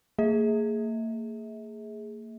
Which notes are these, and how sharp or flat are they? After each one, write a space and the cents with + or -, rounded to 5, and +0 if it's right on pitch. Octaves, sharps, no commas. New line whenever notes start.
A#3 -40 G#4 +5 E5 -40